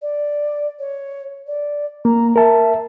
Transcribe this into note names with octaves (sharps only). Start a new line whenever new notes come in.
D5
C#5
D5
A#3 A#5
A#4 E5 A5